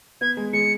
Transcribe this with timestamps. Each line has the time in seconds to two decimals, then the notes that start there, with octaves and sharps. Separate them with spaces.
0.21 B3 G#6
0.37 G#3
0.53 G#3 C#7